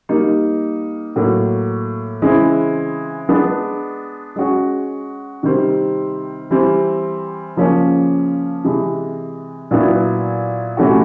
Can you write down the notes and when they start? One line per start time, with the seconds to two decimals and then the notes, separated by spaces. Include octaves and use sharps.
0.09 G3 A#3 D#4
1.16 A2 F#3 A#3
2.22 C#3 E3 G#3 C4 E4
3.29 G#3 B3 D4
4.36 G#3 C#4 F#4
5.43 C3 D#3 G3 C4
6.51 E3 G3 C4
7.57 C#3 F3 A#3 C#4
8.64 C3 E3 G#3
9.71 A#2 F#3 B3 E4
10.77 C3 E3 A3 C#4 F#4